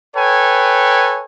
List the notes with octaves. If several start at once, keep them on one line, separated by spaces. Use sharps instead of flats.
A4 B4 C#5 G5 G#5